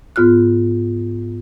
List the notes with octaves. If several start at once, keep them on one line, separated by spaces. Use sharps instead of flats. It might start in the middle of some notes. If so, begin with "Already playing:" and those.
G#2 B3 F4 F6 F#6